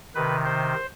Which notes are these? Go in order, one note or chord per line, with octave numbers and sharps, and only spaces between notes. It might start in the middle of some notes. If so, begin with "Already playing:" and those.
C3 D#3 B4
C5